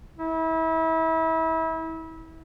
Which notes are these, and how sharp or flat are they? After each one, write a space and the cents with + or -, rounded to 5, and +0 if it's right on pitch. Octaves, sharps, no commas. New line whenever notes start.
E4 -30